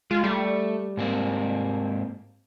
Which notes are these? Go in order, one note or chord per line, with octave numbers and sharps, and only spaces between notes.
G#3 F4
G3 A3
G#2 A#3 C4